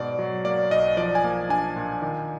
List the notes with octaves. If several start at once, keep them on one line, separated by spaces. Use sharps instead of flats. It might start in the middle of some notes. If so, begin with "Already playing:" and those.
Already playing: G#2 B2 D5
F#3
A#3 D5
B1 D#5
F3 D5
G#5
A#3
D4 G#5
A#2
D#3